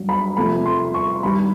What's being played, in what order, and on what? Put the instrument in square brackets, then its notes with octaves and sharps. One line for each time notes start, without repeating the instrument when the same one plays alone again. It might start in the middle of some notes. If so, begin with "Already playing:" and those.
Already playing: [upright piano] G2 F#3
B5
C3 F3 A3 B5
C6
C#6
G2 D#3 G3 B5